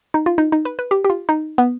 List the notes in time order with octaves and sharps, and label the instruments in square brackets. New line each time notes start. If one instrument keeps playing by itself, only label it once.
[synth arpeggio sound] D#4
F4
D#4
D#4
B4
B4
G4
G4
F4
D#4
B3